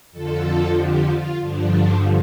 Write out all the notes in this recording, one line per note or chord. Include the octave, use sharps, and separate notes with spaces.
F2 D3 F3 A4
G4
F4
G2 D3 F3 D4